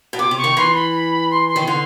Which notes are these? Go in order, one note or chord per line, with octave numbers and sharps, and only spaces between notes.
B2
C3 D6
C3
C#6
D#3
E3 C6
B5
C6
C6
D#3
D3 C6